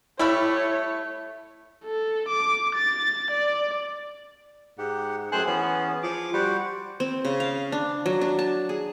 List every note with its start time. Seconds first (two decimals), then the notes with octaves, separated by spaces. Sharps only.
0.19 G3 A3 E4 C#5 E5 B5
1.85 A4
2.29 D6
2.75 A6
3.31 D5
4.78 G#2 G4 F#5
5.32 F#2 A3 G#4 C5 G5 F#6
5.47 E3 B3 C#4 G#4
6.03 F3 D6
6.33 G3 F#4 C5 F#5
7.00 C4
7.25 C#3
7.40 F5
7.72 D4
8.06 F#3
8.21 D4
8.39 A5
8.69 G#4